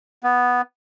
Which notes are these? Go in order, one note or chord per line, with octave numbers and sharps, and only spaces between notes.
B3